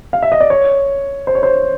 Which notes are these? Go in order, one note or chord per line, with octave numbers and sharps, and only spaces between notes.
F5
E5
D#5
D5
C#5
C5
C#5
C5